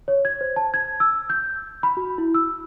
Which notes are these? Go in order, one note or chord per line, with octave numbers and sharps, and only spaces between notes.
C#5
G#6
C5
A5
G#6
E6
G6
B5
F#4
E4
E6